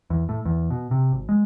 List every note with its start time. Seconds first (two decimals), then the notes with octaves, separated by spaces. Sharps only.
0.10 E2
0.29 A2
0.45 E2
0.70 B2
0.91 C3
1.12 G#1
1.29 G#3